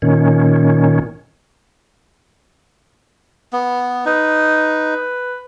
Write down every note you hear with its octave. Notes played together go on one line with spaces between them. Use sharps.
A#2 D#3 C#4
B3
D#4 B4